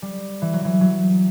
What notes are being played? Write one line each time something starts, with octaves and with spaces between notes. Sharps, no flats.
G3
E3
F#3
E3
F#3